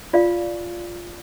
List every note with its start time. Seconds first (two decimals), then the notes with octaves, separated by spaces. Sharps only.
0.13 F4 D5 F5